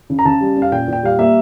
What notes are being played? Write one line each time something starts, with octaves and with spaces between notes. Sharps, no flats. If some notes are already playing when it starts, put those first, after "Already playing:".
C#3
A#5
C#3 A5
G3
C#4
F5
A#2 G5
A#2 G5
G3 F5
A#3 E5